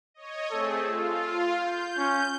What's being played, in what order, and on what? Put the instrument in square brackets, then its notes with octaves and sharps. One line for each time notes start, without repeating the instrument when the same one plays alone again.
[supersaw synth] C#5 D#5
[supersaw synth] A3 C4 G#4 [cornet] A4
[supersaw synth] F4
G6
[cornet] C#4